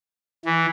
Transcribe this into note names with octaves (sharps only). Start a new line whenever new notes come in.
E3